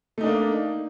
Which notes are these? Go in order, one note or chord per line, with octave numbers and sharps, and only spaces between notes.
A3 A#3 D4 D#4